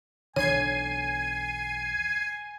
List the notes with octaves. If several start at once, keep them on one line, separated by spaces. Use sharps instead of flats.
B1 E2 D3 C#5 G#5 G#6 C7 D#7